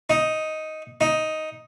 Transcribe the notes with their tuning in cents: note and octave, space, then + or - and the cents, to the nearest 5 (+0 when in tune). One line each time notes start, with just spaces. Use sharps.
D#4 +5
D#4 +5